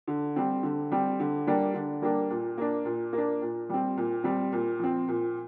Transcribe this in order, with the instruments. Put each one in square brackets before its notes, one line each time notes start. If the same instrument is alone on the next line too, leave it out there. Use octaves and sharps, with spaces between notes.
[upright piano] D3
G3 C4
D3
G3 C4
D3
G3 A#3 D4
D3
G3 A#3 D4
A#2
A#3 D4
A#2
A#3 D4
A#2
G3 C4
A#2
G3 C4
A#2
F3 C4
A#2